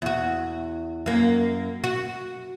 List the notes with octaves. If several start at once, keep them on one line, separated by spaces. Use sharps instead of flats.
E2 F#4
F#2 A#3
F#4